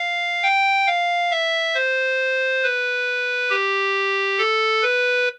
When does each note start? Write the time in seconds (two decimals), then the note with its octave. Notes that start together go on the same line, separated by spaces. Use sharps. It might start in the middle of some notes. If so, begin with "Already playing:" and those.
Already playing: F5
0.43 G5
0.87 F5
1.31 E5
1.74 C5
2.63 B4
3.50 G4
4.38 A4
4.82 B4